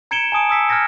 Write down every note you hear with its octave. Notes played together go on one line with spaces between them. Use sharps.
A#5 G#6 C#7 D7 E7 G7
G#5 A5 D#6 D7
D#6 E6 B6 C#7
D#6 F6 G6 G#6 A#6 C#7